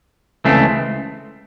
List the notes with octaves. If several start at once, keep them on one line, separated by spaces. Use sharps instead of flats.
C#2 C#3 E3 A3 C4